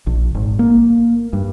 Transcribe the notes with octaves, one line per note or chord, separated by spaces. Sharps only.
A#1
G#1
A#3
G2